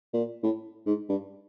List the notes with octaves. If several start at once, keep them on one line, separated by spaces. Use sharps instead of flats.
A#2
A2
G#2
G2